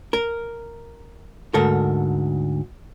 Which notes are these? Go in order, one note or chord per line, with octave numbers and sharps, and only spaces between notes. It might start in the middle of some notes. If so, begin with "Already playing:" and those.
A#4
D2 G#2 A4 A#4